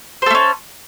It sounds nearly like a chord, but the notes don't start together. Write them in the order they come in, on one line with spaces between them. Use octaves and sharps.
C5 A4 A3 C#4